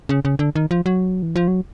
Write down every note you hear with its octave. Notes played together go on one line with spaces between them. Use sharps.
C#3
C#3
D3
D#3
F3
F#3
E3
F3
F#3